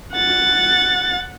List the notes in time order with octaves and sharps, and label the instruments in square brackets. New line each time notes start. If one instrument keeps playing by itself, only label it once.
[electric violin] F#5 A6